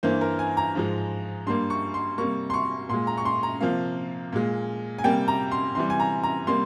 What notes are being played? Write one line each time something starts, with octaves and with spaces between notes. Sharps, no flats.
G2 E3 A#3 C5
A#4
G#5
A#5
G#2 F3 G#3
G2 G3 A#3 C6
C#6
C6
C3 G3 A#3 C#6
C6
C#6
A#2 G#3 C6
A#5
C#6
C6
A#5
C3 F3 A#3 F5
A#2 G#3
G#5
C3 G3 A#3 G5
A#5
C6
C3 E3 G3 C6
G#5
A#5
A#5
C3 G3 A#3 C6